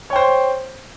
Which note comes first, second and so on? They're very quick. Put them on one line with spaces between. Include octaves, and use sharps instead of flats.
C#5 G5 C5